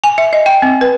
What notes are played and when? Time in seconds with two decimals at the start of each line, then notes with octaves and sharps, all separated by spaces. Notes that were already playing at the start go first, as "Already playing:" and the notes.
0.04 G#5
0.18 E5
0.33 D#5
0.46 G5
0.62 C4
0.81 B4